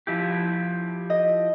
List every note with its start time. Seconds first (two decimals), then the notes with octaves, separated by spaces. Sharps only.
0.07 F3 E4 G4
1.10 D#5